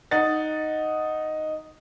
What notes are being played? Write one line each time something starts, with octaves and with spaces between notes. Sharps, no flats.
D#4 F#5 A6